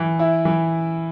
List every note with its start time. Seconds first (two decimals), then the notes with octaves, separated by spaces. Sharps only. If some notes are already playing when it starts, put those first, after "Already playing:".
Already playing: E3
0.19 E4
0.45 E3